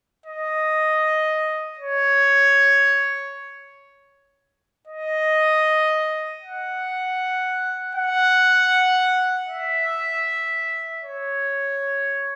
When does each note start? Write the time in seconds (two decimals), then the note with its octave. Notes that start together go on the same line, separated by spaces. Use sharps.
0.26 D#5
1.79 C#5
4.88 D#5
6.42 F#5
7.95 F#5
9.49 E5
11.04 C#5